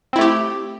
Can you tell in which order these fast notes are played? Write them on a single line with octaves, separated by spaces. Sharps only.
C4 E4 A3 G4